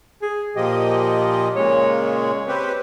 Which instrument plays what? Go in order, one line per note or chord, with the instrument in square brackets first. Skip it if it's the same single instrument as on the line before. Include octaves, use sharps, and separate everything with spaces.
[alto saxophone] G#4
[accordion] A#2 F3 D#5 [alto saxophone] G4
[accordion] A#2 C#3 G#3 [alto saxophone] C#5
[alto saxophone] C#5
[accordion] C4 G4 B4